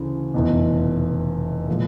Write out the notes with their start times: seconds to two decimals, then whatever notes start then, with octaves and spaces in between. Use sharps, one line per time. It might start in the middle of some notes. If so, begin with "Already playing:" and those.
Already playing: D2 C#3 E3
0.34 F1 E2 B2
1.68 A#2 F3 G#3